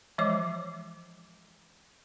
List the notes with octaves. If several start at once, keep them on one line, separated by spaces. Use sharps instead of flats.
E3 F3 G#3 E5 D6